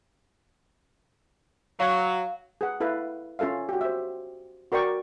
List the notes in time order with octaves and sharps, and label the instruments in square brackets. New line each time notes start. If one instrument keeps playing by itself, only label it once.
[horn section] F#3 [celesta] F5
[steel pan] G#4 B4 F#5
E4 A4 B4 F5
C#4 F4 A4 E5 F5
F#4 G4
C5 E5
F#4 A#4 D5 G5 C#6 D6